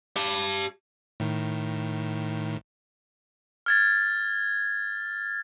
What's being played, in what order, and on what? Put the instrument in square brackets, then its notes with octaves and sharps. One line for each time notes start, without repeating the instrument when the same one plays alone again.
[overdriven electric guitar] G4 A5
[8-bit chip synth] A2 D#3
[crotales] F6 G#6 A6